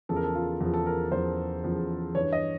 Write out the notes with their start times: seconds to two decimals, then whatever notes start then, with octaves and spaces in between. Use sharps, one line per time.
0.09 E2 C#3 F3 A4
0.16 A#4
0.24 A4
0.35 F4
0.61 E2 C#3 F3
0.74 A4
0.86 A#4
1.12 E2 C#3 F3 C5
1.64 E2 C#3 F3
2.15 G2 E3 C#5
2.32 D#5